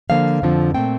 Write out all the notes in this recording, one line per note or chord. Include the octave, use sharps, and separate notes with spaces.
D3 F3 A#3 F5
F2 D3 F3 C4
A#2 A3 C4 G5